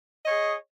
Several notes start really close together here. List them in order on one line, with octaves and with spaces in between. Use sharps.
D#5 C#5 G#4